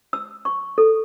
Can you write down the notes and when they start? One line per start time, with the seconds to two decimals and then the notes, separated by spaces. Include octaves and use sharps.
0.13 E6
0.45 C#6
0.78 A4